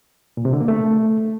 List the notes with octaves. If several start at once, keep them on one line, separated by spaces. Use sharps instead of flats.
A#2
C3
D3
A#3
A3